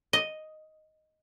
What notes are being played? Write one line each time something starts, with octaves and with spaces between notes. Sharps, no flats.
D#5